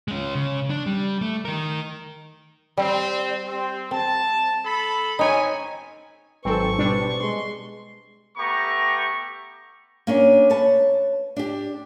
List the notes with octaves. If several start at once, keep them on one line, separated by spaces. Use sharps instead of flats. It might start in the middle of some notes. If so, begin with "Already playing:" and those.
G#3 C#4
C#3
D4
G3
A3
D#3 A#4
G3 C4
C4
C4 A5
A4 B5
C4 C#4 D#4 C#5 G#5
G#1 G#2 F#3 C4 A4 B4 C#6
B2 G3 C4 D4
G#3 C6
A3 B3 G4 A#5 C#6 D6
A#3 C#4 D4
B4 C#5 A5
D4 G4